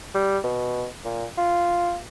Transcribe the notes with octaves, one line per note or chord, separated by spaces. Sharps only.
G3
B2
A#2
F4